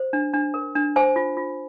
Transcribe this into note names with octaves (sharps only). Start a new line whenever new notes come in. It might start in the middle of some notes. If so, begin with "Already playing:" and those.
Already playing: C5
D4
D4
A#4
D4
C5 G#5
F4
F4